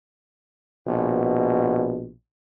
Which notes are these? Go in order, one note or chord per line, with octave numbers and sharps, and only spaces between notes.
A#1 B2